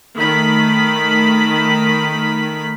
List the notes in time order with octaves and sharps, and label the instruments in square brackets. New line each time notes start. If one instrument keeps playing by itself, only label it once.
[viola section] D#3 A3 B5